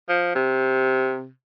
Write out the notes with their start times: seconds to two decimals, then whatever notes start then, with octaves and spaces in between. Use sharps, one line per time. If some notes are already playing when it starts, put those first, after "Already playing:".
0.09 F3
0.35 C3